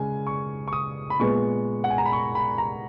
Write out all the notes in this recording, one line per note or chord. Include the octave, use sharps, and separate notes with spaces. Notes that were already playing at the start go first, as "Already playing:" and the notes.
Already playing: C#3 G#3 G#5
C#6
C#6
D#6
B5
A#2 G#3 B3 C#6
F#5
G#5
A#5
B5
C#6
B5
A#5